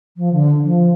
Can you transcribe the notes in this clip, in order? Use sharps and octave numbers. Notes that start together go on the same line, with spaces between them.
F3
D3
F3